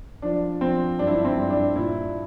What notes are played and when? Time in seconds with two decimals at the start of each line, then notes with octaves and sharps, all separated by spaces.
0.22 F3 D4
0.61 F3 C4
0.99 G2 D4
1.07 E4
1.15 D4
1.25 C4
1.37 G2
1.50 D4
1.76 A#2 E4